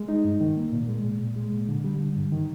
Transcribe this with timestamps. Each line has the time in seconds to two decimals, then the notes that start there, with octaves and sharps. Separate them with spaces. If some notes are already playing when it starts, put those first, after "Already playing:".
Already playing: G#3
0.09 D#4
0.25 G2
0.41 D#3
0.57 A#3
0.73 A#2
0.89 G#3
1.04 A#2
1.21 A#2
1.36 G#3
1.52 A#2
1.69 D3
1.84 G3
2.01 D3
2.16 G2
2.32 D#3